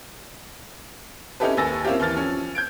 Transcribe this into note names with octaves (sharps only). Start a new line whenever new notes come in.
C#4 D#4 E4 G4 A4 B4
D#2 B4 G#5 E6 A6 A#6
A#3 C4 C#4 E4 F4 G4
D#2 E3 F6 A6
F3 C#4
G6 G#6 D7